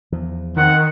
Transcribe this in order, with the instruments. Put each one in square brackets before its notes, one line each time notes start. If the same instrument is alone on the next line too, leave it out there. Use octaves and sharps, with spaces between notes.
[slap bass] E2 F3
[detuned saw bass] D#3 [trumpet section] C4 F#5